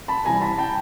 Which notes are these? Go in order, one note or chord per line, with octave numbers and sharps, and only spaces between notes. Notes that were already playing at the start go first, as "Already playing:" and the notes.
A5 B5
C3 E3 G3 G#5 A#5
A5 B5
G5 A5